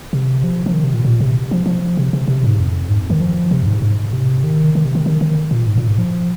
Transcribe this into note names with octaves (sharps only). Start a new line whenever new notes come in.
C3
F3
F3
D#3
C3
A#2
A#2
C3
F3
F3
C3
C3
C3
G#2
F2
G#2
F2
D#3
F3
C3
F2
G#2
G#2
C3
D#3
D#3
C3
D#3
D#3
D#3
A#2
G#2
A#2
G#2
F3